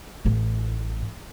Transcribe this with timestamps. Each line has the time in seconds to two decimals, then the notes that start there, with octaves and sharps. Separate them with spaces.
0.25 A1 A2